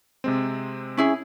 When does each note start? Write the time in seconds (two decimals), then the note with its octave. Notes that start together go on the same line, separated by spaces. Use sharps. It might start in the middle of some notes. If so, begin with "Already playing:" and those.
0.24 C3 G#3 C4
0.97 C#4 E4 G#4